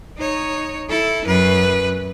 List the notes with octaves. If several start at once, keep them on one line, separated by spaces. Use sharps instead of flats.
D#4 C#5
E4 A4
F#2 B4